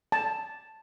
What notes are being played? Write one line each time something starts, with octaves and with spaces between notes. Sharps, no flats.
A5